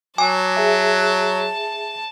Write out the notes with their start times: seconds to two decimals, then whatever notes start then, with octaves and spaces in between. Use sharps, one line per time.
0.18 F#3 G#5 A5 D6
0.57 G#4 E5